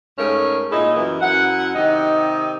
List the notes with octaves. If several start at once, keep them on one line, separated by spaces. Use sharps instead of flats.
G#2 A3 C#4 A#4
A#2 D#4 E4 G#4 D#5
F#2 E3 B3 E4
F#2 E4 F#5
C3 D#3 D#4 D#5